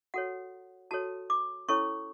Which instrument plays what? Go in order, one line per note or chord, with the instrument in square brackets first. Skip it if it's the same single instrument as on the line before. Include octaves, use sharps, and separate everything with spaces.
[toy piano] F#4 A4 C#5 F#5
F#4 A4 C#5 A5
D6
C#4 E4 A4 C#5 C#6